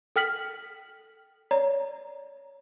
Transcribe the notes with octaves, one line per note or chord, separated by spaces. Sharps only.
A4 G5 F6 B6 F#7
C#5 D5 A#5